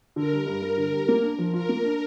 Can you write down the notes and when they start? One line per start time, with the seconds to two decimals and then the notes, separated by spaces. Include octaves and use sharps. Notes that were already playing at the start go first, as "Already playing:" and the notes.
0.16 D3 A#4
0.32 G3
0.46 G2
0.62 G2
0.77 D3
0.93 G3
1.08 A#3
1.23 D4
1.39 F3
1.54 F4 A#4
1.69 A#3
1.85 D4